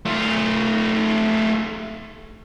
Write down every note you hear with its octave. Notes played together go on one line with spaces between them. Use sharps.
A3 F4